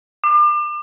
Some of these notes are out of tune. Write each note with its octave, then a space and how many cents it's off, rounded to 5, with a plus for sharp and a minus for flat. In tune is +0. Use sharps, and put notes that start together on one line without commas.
D6 +35